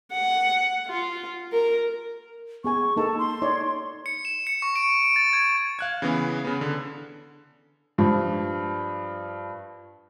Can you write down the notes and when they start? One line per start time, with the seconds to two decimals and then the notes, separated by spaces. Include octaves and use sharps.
0.12 F#5
0.87 F4
1.53 A#4
2.64 B3 G#4 G#5 C#6
2.96 A#3 D#4 A4 A5
3.18 C6
3.42 D#4 C#5 D5
4.06 C#7
4.25 E7
4.47 C#7
4.62 C#6
4.76 D7
5.03 D7
5.16 A6
5.33 G#6
5.79 F5 F#6 G#6
6.02 C#3 E3 B3
6.44 C#3 B3
6.61 D3
7.98 G2 F3